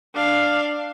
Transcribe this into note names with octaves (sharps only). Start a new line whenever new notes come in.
D4 F5